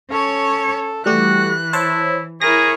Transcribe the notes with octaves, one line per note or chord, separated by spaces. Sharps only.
C#4 A4 C#5
E3 G3 A3 F#4 G4 F#6
E4 C5 C#5 A5
E4 G#4 A#4 C#5 A#6